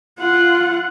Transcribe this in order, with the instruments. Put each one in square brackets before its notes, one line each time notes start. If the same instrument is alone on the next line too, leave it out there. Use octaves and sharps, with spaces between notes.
[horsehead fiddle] F4 F#5